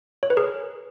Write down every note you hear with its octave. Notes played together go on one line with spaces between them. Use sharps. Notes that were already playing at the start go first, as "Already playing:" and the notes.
C#5
B4
G#4 A#4